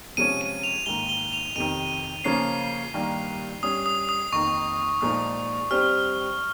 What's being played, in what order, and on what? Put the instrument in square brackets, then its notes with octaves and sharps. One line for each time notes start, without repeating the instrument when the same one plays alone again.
[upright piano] C3 F3 G#3 C#4 [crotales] D#7
[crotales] D#7
F7
[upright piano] G#2 D#3 A#3 [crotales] G7
[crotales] G7
F7
[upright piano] F2 C3 D#3 [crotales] D#7
[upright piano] C#3 F3 A#3 C#4 [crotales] C7
[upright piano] G2 D#3 G3 A#3
[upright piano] G2 G3 C#4 [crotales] D#6
[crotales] D#6
D#6
[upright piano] F2 D#3 A#3 D#4 [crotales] C#6
[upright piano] A#2 F3 G#3 D#4 [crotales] D#6
[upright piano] G2 G3 C4 [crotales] F6